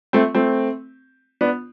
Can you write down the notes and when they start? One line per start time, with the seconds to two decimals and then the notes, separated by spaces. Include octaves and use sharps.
0.13 A3 C4
0.35 A3 C4
1.41 B3 D4